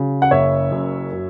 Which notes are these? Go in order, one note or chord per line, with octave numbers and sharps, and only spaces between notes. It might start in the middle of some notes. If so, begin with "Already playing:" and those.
Already playing: C#3 F#3
F#5
F#1 C#5 E5
F#2
F#3